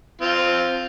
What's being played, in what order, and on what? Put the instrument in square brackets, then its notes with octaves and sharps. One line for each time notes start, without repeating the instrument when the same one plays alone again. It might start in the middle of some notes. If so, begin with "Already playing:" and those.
[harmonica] C4 F4